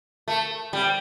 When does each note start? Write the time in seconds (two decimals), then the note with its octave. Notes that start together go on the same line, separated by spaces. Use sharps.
0.28 A3
0.73 G3